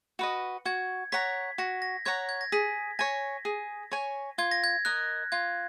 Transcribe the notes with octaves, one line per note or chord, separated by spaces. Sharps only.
F#4 B4 D#5
F#4 G#6
C#5 F#5 A#5 B6
F#4 A#6
A#6
C#5 F#5 A#5 G#6
G#6
A#6
G#4 B6
C#5 G#5 A#6
G#4
C#5 G#5
F4 G#6
A#6
G#6
A#4 D#5 F#6
F4 G#6